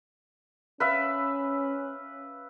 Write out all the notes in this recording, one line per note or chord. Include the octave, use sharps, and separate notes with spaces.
C#4 B4 E5 F5